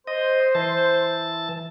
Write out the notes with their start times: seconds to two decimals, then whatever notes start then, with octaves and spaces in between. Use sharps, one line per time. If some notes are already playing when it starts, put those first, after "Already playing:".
0.07 C5 D#5
0.55 E3 A5